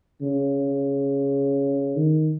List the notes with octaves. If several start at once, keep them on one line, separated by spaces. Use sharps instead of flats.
C#3
D#3